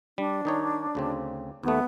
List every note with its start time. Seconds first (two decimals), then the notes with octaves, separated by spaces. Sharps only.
0.18 G3 D4
0.45 D#3 D#4 C#5
0.95 D2 C#3 C4
1.63 D#2 A3 B3